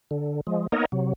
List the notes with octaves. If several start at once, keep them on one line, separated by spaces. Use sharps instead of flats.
D3
F3 G#3
A#3 B3 D#4 A#4 C#5 D#5
C3 F#3